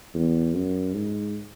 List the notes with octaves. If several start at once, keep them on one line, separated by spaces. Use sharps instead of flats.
E2
F#2
G#2